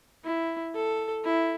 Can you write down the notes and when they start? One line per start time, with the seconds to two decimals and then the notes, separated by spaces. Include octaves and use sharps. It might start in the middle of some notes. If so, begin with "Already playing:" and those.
0.24 E4
0.75 A4
1.24 E4